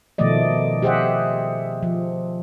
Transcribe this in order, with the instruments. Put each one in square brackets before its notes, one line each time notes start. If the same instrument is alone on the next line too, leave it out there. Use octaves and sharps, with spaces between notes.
[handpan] B2 D#3 F3 A3 D5 D#5
G4 G#4 C5 D#5 E5 F#5
F3